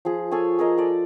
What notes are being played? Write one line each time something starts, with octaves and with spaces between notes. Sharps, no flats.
F3 G#4
G#4 A4 C#5 G#5
G#4 A#4 D#5
A4 D5